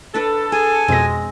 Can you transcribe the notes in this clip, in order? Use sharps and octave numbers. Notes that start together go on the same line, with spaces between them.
D4 A4 B4 D5
G#4 G#5
F2 B2 G#3 C4 A#6